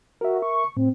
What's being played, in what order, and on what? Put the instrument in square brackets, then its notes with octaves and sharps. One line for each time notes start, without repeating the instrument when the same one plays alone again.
[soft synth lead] F#4 [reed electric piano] A#4 E5
[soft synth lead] C#6
[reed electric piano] A2 [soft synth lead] C4